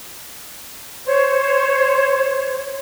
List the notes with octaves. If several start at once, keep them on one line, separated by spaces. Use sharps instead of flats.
C5 C#5